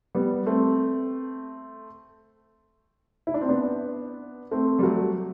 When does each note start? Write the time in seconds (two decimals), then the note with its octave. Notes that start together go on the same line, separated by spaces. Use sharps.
0.15 G3 B3
0.46 A3 C4
3.27 E4
3.34 D4
3.41 C4
3.49 B3 D4
4.51 A3 C4
4.79 G3
4.83 F#3 A3